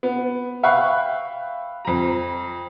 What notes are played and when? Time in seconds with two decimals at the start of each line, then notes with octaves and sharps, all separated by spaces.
0.03 B3
0.63 E5 F5 G5 B5 C#6 F#6
1.85 F2 A#5